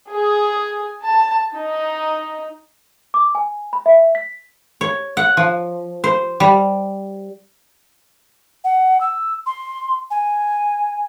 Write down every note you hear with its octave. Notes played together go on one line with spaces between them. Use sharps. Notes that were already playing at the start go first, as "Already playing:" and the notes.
G#4
A5
D#4
D6
G#5
B5
E5
B6
C#5
F#5
F3
C5
G3
F#5
E6
C6
G#5